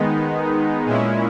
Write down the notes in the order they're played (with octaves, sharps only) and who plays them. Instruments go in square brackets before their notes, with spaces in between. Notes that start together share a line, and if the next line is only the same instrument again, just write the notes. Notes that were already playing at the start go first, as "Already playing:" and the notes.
Already playing: [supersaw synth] D#3 G#3 B3 D#4
A#2 G#3 C#4 E4